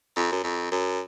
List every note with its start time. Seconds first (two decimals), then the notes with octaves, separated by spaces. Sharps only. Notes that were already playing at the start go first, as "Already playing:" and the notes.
0.16 F2
0.32 F#2
0.44 F2
0.72 F#2